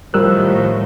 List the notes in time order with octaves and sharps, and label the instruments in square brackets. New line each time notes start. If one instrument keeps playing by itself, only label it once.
[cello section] A2 D#3 [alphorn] F3 [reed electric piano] G3 E6 F#6 [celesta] A#4 A#5